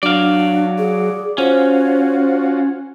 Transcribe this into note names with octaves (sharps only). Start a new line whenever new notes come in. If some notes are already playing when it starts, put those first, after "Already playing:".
F#3 D4 D5 F5
G#4
C#4 F4 F#4 C5